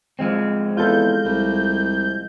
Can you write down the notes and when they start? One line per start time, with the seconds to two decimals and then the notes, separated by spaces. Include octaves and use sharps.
0.19 F3 G#3 C4
0.77 E2 F4 A4 G6
1.25 C2